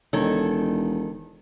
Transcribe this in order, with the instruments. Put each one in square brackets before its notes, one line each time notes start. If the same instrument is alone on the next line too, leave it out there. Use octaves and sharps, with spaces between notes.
[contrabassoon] E1 [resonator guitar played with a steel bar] D#3 A4 C#5